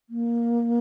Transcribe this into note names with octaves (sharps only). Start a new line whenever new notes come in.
A#3